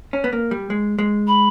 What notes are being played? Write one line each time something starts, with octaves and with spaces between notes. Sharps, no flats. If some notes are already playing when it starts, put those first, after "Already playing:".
C#4
B3
A#3
G3
G#3
G#3
B5